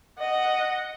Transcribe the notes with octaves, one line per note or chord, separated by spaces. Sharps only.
D#5 F#5